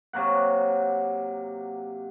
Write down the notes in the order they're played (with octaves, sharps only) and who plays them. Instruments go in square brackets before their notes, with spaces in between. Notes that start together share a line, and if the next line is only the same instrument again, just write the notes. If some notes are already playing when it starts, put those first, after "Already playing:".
[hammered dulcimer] C3 F#3 A#3 F#5